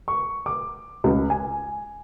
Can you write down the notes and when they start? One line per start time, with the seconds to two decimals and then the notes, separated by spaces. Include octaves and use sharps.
0.08 C#6
0.46 D6
1.04 C#2
1.30 G#5